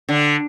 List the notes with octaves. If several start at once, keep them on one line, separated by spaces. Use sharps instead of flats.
D3